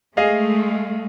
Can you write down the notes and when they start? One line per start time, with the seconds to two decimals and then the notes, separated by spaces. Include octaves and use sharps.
0.17 G#3 A3 G#4 D#5 F5